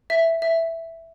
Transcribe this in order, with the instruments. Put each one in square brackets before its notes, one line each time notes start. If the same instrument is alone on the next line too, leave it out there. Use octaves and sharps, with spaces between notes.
[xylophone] E5
E5